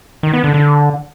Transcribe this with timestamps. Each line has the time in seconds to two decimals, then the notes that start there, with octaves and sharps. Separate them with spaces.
0.23 D#3
0.33 B3
0.44 D3
0.54 D3